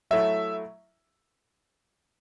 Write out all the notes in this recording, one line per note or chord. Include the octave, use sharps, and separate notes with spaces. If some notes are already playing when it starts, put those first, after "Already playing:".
F#3 A3 E4 E5